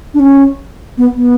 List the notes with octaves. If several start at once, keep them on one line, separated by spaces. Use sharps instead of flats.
D4
C#4
B3
B3